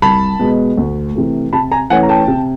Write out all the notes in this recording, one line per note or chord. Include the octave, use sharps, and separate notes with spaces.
C2 A5 B5
B2 G#3 B3
D2
C3 E3 A3
C3 A5 B5
G#5 A#5
E3 A3 C#4 F#5 G#5
A#5
G5 A5
C3